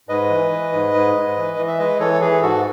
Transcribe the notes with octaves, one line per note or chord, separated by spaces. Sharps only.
G#2 B4 D#5
E3
E3
G#2
G#2
G#2
E3
E3
E5
G#3 B4 D#5
E3 A4 C#5
A4
E3 G#4 B4
G#2 F#4 A4